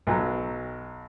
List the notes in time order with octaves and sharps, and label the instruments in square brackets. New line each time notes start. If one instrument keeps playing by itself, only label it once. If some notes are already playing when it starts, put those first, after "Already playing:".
[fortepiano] B1 F#3 A#5